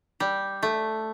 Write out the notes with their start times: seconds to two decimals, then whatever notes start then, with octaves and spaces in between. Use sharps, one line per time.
0.20 G3
0.63 A3